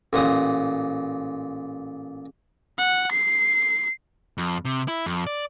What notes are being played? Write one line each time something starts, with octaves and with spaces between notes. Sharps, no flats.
A1 A#2 F#5 D#6
F#5
C7
F2
C3
E4
F2
D5